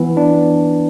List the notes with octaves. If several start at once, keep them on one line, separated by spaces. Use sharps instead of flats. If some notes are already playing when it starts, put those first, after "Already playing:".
Already playing: E3 B3
D4